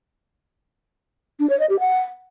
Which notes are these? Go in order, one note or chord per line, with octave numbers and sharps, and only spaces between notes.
D4
C#5
D#5
G4
F#5